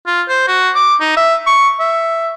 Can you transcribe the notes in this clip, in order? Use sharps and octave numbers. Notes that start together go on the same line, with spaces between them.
F4
C5
F#4
D6
D#4
E5
C#6
E5